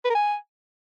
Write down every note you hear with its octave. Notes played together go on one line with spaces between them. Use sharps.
B4
A#4
G#5